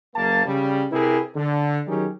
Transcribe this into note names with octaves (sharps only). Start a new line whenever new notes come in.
F#1 A#3 A5
C#3 G3
C3 E4 G4 G#4 A#4 B4
D3 A4
D#3 F#3 C#4 D#4 G4 G#4